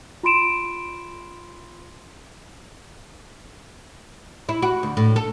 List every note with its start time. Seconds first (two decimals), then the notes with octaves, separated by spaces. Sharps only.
0.23 F4 B5 C6 D7 E7
4.49 E4
4.62 F#4
4.83 D2
4.97 A2
5.16 A4